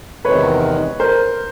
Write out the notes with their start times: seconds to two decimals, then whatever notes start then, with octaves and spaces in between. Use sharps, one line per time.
0.25 E2 C3 D#3 G#3 B4 C#5
1.00 A#4 C5